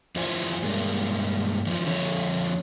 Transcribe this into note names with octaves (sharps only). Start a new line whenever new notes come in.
F2 E3 F4 C5 D5 G#5
G2 G#3 A#3 D4
F#2 E3 F3
F2 D3 C#5